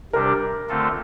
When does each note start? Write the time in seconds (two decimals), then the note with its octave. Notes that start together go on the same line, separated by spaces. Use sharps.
0.13 C3 G3 D4 G4 A#4
0.69 D3 A3 C4 F4 A4